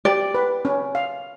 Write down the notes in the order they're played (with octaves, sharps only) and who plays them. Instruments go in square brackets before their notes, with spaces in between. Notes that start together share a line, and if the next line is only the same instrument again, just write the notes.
[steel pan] G4 [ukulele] D5
[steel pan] B4
C#4
F5